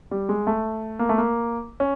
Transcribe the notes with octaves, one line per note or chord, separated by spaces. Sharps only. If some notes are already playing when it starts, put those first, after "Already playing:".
G3
G#3
A3
A#3
A3
A#3
C#4